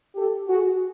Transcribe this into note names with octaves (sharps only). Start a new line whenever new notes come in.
G4 A4
F#4 G#4